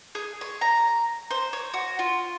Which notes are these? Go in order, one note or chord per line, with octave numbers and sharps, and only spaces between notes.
G#4
C#5
A#5
C5
C#5
F#4
F4